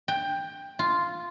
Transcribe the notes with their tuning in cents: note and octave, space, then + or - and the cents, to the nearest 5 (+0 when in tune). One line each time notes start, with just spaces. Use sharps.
G5 +15
F4 -5